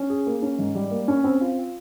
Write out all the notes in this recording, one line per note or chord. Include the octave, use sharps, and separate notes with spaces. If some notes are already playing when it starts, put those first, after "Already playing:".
Already playing: C#4
G#4
A#3
C#4
G#2
G3
A#3
C#4
C4
F4